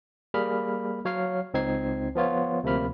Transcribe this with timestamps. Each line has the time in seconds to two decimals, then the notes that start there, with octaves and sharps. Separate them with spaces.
0.34 G3 A#3 G#4 B5 F6
1.05 F#3 C#5 F5 F6 C7
1.54 C#2 C4 D#4 G#6 C7
2.15 F3 B3 F4 C#5
2.63 D2 C3 F3 A#3 B5 F6